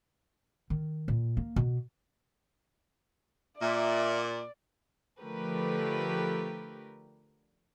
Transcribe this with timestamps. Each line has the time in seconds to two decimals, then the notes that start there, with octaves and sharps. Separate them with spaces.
0.70 D#3
1.08 A#2
1.37 A#3
1.56 B2
3.60 A#2 D5 E5
5.21 D3 F3 A3 G4 A#4 B4